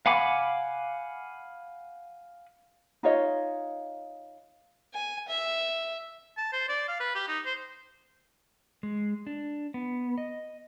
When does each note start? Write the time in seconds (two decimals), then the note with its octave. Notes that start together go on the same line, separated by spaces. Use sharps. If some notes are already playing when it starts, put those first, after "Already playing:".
0.06 F5 F#5 G#5 B5 D6
3.03 D#4 F4 C#5 D#5
4.94 G#5
5.29 E5
6.37 A5
6.53 C5
6.69 D5
6.88 F5
7.00 B4
7.15 G4
7.28 D#4
7.45 C5
8.83 G#3
9.27 D4
9.74 B3
10.18 D#5